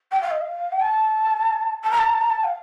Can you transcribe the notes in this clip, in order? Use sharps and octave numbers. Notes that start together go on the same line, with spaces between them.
G5
F5
D#5
F5
G5
A5
A5
A#5
A5
A#5
A5
A#5
A5
F5